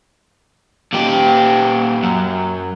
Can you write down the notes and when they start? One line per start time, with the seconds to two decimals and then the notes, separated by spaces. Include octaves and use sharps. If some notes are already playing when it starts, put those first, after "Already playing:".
0.93 A#2 G4
2.03 F#2